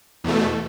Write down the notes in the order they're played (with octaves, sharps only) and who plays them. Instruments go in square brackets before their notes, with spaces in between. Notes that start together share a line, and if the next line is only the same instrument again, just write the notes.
[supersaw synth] E2 B2 A3